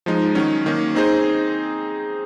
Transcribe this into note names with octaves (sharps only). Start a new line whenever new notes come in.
F3 G#3 D#4
D#3 F#3 C#4
D#3 A#3 C#4
C4 D#4 G#4 C5